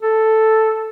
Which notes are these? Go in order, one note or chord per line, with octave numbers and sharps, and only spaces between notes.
A4